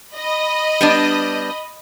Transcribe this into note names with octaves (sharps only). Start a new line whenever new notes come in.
D#5 B5
G3 B3 D4